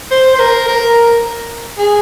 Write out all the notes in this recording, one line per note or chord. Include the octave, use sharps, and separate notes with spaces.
C5
C5
A#4
A#4
G#4